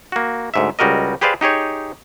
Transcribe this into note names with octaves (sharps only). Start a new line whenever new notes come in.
A#3 F#4
D2 G#2 E5
C#2 G3 F#4 A#4 D#5
G4 G#4 B4 C5 D5 F5
D#4 G4 G#4 C#5